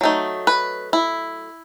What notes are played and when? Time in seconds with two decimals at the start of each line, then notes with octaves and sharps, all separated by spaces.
0.01 F#3 A3 D#4
0.47 B4
0.93 E4